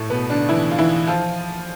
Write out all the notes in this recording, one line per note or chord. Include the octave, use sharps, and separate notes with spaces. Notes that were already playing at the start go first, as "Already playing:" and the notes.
Already playing: A2 A3
B2 B3
D3 D4
E3 E4
F4
E3 E4
F3 F4